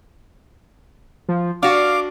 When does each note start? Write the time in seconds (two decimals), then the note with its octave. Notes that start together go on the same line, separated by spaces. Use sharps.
1.29 F3
1.63 D4 F#4 F5 D6